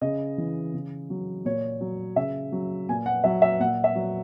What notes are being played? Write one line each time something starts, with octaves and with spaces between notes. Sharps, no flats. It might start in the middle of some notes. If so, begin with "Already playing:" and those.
C#3 D#5
E3
C#3
F#3
A#2 C#5
F#3
C#3 E5
F#3
A#2 G#5
F#5
F#3 E5
E5
A#2 F#5
E5
F#3